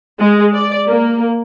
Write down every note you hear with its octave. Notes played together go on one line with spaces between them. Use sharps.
G#3
D5
A#3